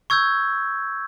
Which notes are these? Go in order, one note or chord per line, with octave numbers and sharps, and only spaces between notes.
C#6 E6 G6 G#6